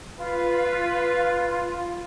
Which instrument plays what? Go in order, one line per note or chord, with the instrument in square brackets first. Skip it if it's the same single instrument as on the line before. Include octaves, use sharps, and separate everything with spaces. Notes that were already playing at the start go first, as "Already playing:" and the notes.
[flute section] F4 [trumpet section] B4